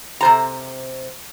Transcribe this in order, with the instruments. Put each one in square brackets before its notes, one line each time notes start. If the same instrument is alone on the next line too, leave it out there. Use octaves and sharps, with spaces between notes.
[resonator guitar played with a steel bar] C3 C5 A#5